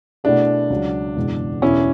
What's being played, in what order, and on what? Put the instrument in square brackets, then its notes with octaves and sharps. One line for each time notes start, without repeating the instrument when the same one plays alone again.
[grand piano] B2 A3 E4 G#4 [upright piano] D4
[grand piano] C#2 C#3 F#3
F#1 E2 B2 G#3
[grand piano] E1 E2 B2 [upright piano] C#4 E4